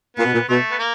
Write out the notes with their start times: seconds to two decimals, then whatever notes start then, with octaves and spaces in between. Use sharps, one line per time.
0.17 A#2 B3
0.25 B2
0.34 A#2
0.49 B2 A3
0.71 B3
0.79 A#3